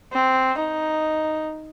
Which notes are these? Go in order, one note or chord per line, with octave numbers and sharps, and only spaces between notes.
C4
D#4